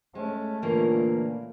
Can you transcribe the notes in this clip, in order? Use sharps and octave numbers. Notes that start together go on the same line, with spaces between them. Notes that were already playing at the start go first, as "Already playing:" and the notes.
G#3 A3 C#4
A#2 D3 E3 A#3